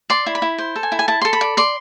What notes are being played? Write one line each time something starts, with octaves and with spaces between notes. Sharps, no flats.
D5 C6
E4
B5
E4
C5
A4
G#5
E4
G#5
E4 A5
A4 C6
B5
D5
D5 C6